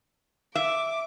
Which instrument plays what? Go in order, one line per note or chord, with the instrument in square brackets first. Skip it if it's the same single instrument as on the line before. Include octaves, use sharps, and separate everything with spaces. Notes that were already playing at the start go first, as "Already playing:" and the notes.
[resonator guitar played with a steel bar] E5 [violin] D6